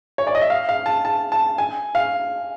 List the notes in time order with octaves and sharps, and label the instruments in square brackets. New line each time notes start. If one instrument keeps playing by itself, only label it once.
[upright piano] C#5
D5
D#5
E5
F5
F5
A5
A5
A5
G#5
F5